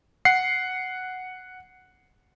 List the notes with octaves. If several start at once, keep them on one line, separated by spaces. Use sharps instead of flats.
F#5 C7